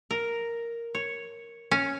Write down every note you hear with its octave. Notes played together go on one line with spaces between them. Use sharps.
A#4
C#5
C#4